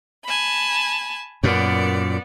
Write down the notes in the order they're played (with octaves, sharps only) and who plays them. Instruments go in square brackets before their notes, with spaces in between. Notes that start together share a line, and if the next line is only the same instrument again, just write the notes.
[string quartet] G#5 A5 B5
[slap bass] F#2 A#2 [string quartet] B3 D5